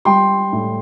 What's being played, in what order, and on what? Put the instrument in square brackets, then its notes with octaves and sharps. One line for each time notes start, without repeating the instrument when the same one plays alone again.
[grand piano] G3 G5 C6
A2